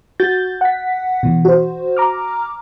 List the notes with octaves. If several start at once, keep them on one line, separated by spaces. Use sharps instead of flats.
F#4 G6 A6
F#5 B6
B2 E3
F#4 C5
A#5 D6 F6